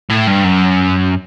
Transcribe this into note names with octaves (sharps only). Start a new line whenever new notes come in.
A2
G2
F#2